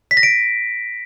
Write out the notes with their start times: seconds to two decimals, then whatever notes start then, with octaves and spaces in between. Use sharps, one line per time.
0.11 B6
0.17 A#6
0.23 D7